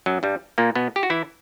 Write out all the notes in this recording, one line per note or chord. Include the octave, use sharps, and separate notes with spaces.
F#2 F#3
G2 G3
A#2 A#3
B2 B3
G4
F#4
E3 E4